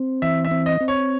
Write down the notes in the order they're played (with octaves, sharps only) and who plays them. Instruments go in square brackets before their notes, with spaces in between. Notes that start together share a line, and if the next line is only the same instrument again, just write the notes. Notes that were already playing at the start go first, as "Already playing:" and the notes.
Already playing: [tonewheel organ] C4
[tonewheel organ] E3 [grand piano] E5
[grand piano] E5
[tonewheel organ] C4
[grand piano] D#5
[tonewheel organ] C4
[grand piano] C#5